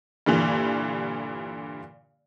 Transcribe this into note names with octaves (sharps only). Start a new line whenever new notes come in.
G2 A#2 D3 E3